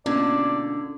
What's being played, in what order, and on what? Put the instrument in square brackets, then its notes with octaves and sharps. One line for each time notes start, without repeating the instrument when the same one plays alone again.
[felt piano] B2 A#3 [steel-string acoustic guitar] D3 [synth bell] C#4 G#6 [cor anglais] D5